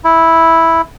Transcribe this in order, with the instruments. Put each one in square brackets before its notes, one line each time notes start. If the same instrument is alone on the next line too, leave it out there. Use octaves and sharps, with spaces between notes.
[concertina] E4